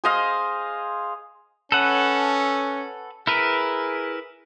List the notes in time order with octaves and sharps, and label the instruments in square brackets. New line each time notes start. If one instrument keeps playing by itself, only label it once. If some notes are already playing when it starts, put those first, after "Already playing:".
[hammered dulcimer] G#4 C5 D#5 F5
[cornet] C#4 [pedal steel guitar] A4 B4 F#5
[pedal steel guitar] E4 A#4 B4 [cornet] G#4